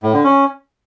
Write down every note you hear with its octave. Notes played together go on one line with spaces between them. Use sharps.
A2
D3
C#4